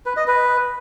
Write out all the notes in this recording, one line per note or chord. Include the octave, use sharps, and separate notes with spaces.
B4
D#5
B4